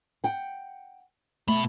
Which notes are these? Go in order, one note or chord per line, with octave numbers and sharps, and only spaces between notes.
F#5 G5
B2 A3 B5